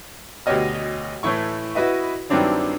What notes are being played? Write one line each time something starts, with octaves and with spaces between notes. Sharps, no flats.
D2 B2 G4 C#5 D#5 F6
A2 E3 A3 E4 C#6
E4 F#4 B4 D#5 E5
G2 D#3 F#3 C4 D4 E4